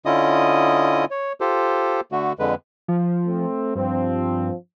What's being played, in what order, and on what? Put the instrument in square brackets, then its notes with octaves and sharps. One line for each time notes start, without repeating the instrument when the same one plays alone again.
[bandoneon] D3 C#4 E4 F4 D#5 D#6
C#5
F4 G4 A4 C5
D3 A3 F#4
F2 D3 G#3 B4
[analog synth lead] F3
[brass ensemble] A3 C4
[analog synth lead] G2 [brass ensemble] F3 C4